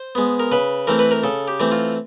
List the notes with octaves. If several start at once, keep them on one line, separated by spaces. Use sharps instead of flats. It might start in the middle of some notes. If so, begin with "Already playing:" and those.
Already playing: C5
G#3 B3
A#4
C#3 B4
E3 A3 C4 A#4
B4
A#4
C#3 A4
G4
E3 A3 C4
F4